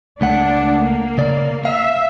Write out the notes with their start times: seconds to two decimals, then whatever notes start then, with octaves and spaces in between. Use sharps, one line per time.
0.21 C#2 A3 D4 F#5
0.81 A#3
1.18 C#3 D5
1.65 E5 F5